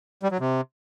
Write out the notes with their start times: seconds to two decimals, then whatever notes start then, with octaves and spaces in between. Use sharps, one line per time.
0.23 G3
0.31 F#3
0.40 C3